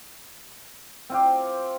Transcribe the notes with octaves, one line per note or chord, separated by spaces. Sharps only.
C4 F4 G4